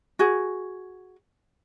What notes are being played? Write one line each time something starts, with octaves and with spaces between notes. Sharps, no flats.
F#4 G#4